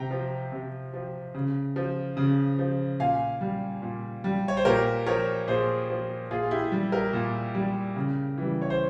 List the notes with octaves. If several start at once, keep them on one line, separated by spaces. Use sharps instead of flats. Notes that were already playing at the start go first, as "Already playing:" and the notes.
Already playing: C3 G5 A#5
F3
C3
F3
C#3
F3
C#3
F3
A#2 F5 G#5
G3
A#2
G3
C#5
C5
A#2 G4 A#4
F3 A#4 C#5
A#2 G#4 C5
F3
A#2 F4 G#4
F4
E4 G4
G3
G4 A#4
A#2
G3
C#3
E3 G3
C#5
C5